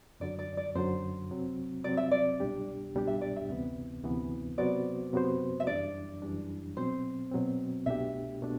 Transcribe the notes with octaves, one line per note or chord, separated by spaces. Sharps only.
F#2 D3 F#3 D5
D5
D5
F#2 D3 F#3 C5
C3 F#3 C4
C3 F#3 C4 D5
E5
D5
C2 B2 G3 D4 G4
C2 B2 G3 D4 G4
E5
D5
E5
D2 C3 E3 B3
D2 C3 E3 B3
C3 F#3 B3 F#4 C5 D5
C3 F#3 B3 F#4 C5
E5
F#2 E3 G3 D4 D5
F#2 E3 G3 D4
B2 F#3 C4 C5
B2 F#3 C4
C2 B2 A3 D4 G4 E5
B2 A3 D4